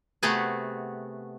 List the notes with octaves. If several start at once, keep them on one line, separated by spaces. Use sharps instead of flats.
C3 A3 B3 F#4 G#4